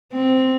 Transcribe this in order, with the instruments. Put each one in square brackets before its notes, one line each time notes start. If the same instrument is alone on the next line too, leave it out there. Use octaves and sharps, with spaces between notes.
[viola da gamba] C4